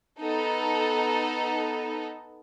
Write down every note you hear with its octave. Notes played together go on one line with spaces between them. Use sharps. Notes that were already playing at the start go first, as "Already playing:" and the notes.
B3 D#4 A4